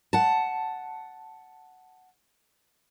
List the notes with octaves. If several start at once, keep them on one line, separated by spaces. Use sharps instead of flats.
F#5 A5